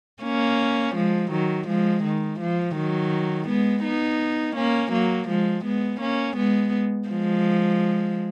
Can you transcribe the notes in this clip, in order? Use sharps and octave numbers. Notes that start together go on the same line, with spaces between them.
A#3 C#4
F3 G#3
D#3 F#3
F3 G#3
D#3
F3
D#3 F#3
G#3 B3
B3 D#4
A#3 C#4
F#3 A#3
F3 G#3
G#3 B3
A#3 C#4
G#3 B3
F3 G#3